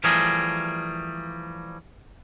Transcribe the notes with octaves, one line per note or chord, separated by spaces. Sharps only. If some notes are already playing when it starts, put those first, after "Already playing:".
E3 F3 G3 A3 G#4 A#4